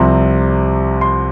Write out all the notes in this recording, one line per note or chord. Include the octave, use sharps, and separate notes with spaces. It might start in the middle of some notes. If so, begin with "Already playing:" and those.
Already playing: C2 C3 F3 C6
C6